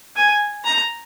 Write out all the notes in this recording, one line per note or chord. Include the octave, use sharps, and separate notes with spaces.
G#5
A#5